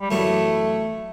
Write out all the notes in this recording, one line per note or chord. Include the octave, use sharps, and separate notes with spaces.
G3
F#2 E3 A3 B3 D4